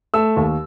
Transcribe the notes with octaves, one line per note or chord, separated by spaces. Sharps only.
A3 E6
D#2